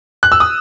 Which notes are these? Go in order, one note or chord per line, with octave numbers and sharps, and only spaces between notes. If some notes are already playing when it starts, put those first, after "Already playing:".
F#6
E6
D#6